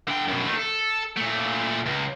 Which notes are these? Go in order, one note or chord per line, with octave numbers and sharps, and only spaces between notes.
D3 G5
F#2 B2
D#3 A3
A4
A#2 A3
C#2